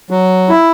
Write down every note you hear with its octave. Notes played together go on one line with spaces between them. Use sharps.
F#3
E4